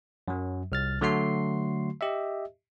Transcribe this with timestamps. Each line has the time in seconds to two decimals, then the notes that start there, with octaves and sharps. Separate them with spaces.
0.28 F#2 F#3
0.72 C2 F6 A6
1.01 D3 F#3 A3 F#4 C6 C7
2.01 G4 D#5 E5